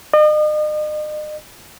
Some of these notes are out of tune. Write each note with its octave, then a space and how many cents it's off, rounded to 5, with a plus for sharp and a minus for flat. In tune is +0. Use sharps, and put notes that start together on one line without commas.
D#5 -40